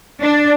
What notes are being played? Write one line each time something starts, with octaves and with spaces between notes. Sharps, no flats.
D4